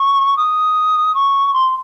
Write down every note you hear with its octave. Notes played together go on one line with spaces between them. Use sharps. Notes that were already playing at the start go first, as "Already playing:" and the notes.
Already playing: C#6
D#6
C#6
C6